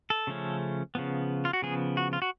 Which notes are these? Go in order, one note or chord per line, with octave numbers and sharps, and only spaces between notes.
A4
C#3 F3 A3 C#4
C#3 F3 B3
F4
F#4
C#3 F3 B3 G#4
F#4
F4
F#4